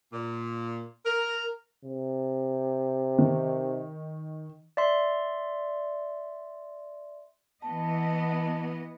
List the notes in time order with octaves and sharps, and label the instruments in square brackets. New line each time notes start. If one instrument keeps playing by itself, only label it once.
[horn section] A#2
A#4
[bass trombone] C3
[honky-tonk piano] D#3
[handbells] D5 E5 C6
[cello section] E3 B3 D#5 [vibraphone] A5